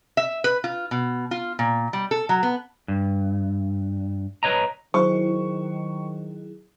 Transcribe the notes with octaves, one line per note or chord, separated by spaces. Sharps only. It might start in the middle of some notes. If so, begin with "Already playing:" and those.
E5
B4
F4
B2
F4
A#2
G3
A4
F#3
B3
G2
B4 C#5 D#5 A#5
D#3 F#3 E4 G#4 C5 C#6